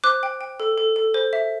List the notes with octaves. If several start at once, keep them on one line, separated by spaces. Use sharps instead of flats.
C5 D6 F#6
G5
G5
A4
A4
A4
C5
E5